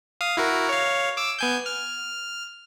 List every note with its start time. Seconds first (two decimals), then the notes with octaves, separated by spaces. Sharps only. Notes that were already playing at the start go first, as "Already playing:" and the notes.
0.21 F5 D#6
0.37 E4 F#4 A#4
0.69 C#5 F5
1.17 D6 E6
1.39 B3 G#5 G6
1.66 F6